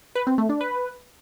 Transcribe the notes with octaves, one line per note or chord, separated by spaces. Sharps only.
B4
C4
A3
D4
B4